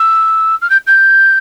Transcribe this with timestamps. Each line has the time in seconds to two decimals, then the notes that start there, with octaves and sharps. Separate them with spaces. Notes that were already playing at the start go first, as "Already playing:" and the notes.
Already playing: E6
0.61 F6
0.70 G6
0.86 G6